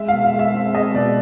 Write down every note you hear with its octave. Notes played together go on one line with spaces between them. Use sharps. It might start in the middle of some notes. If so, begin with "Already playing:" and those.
Already playing: G#3 E5
F5
B2
F5
G#3
E5
C4
G#3 D#5
B2 D5